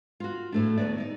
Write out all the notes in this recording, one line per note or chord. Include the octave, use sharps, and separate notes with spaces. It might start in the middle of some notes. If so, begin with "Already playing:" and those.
F4 F#4
A2 A3 D4
D#2 B3 F#4 D5
D#4 D5